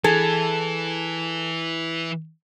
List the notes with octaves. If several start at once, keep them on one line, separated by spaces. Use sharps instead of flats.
E3 G#4 A4